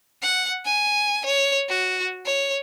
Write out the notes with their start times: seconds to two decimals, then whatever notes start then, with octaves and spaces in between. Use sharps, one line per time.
0.22 F#5
0.65 G#5
1.26 C#5
1.69 F#4
2.25 C#5